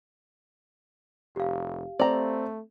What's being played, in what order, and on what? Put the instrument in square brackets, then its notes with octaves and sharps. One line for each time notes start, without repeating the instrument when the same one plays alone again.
[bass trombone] F1 [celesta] G4 F5
[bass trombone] A3 [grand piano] C4 [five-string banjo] D5 A#5